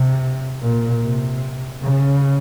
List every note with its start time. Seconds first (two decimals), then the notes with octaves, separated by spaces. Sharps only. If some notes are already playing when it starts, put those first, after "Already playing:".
Already playing: C3
0.61 A#2
1.02 C3
1.83 C#3